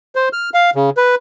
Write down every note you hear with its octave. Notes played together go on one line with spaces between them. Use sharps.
C5
F6
F5
C#3
B4